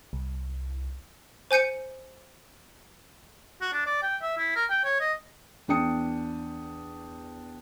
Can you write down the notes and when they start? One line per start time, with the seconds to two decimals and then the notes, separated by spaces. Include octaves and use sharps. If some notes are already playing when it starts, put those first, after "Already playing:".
0.13 C2
1.51 C5 G#5 G6 C#7 D#7
3.61 F#4
3.73 D4
3.86 D5
4.03 G5
4.22 E5
4.38 E4
4.55 A#4
4.70 G5
4.84 C#5
5.00 D#5
5.68 E2 D4 G5 D#6 C#7